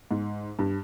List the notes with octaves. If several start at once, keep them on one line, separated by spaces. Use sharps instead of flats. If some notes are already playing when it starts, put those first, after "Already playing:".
G#2
G2